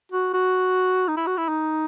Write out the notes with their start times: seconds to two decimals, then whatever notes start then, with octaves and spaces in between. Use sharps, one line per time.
0.12 F#4
0.33 F#4
1.08 D#4
1.17 E4
1.27 F#4
1.37 E4
1.49 D#4